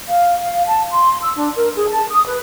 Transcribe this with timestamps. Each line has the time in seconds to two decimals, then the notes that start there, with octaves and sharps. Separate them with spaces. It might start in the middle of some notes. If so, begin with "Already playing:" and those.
0.07 F5
0.41 F5
0.67 A5
0.91 C6
1.21 E6
1.35 D4
1.56 A#4
1.75 G#4
1.88 A5
2.10 D#6
2.27 B4